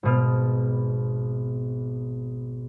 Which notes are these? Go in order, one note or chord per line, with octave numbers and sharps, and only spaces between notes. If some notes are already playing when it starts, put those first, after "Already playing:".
G#1 B2 F6